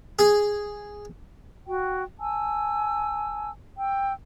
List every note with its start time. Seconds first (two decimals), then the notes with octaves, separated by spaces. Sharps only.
0.19 G#4
1.67 F#4 G5
2.19 G#5 A5 E6
3.78 G5 E6